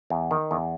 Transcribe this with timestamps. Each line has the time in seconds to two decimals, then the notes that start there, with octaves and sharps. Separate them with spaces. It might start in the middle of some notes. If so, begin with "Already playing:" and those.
0.10 E2
0.31 D#3
0.51 E2